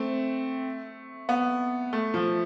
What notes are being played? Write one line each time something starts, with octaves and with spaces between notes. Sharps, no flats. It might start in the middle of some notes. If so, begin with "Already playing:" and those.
Already playing: A3 C4
B3
A3
F3